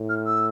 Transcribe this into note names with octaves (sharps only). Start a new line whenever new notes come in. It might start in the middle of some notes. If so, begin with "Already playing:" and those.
Already playing: A2
F6
E6